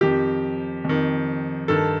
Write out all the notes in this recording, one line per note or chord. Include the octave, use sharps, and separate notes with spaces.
F2 D#3 G4
F2 D#3
G2 D#3 A4